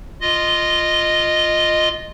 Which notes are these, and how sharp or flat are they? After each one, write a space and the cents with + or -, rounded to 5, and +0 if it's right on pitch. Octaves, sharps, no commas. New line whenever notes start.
F4 +0 D#5 -5